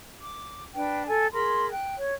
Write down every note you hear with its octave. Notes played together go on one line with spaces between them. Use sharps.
D6
D4 B4 G5
A4 G#5
G#4 A#4 B5 C6
G5 F#6
C#5